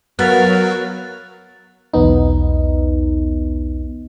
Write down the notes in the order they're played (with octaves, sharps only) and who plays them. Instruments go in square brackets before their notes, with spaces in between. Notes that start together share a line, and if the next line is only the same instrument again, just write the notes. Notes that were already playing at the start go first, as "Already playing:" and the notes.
[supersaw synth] F#3 [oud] B3 [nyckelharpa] A#4 F5 [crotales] F#6 A6
[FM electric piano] B1 E2 B3 D#4